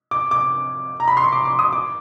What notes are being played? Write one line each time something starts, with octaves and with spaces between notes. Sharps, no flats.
D6
D6
A#5
B5
C6
C#6
D6
D6
D#6
D6